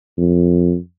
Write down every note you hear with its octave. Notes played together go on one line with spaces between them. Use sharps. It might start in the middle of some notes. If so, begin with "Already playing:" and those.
F2